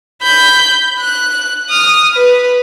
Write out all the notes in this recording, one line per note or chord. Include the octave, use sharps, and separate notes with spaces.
B5 G6
F#6
D#6 F6
B4